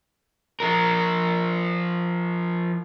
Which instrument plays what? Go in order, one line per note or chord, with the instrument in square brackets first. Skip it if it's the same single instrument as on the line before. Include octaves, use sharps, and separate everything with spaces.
[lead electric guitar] F3 A#4